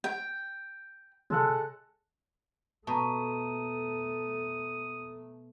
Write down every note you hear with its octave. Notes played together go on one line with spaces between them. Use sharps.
G5
C3 G#3 A4 F#5
B2 A3 A5 A#5 D#6